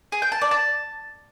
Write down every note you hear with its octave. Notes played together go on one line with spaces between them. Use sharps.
G#4
G5
A5
D5
A5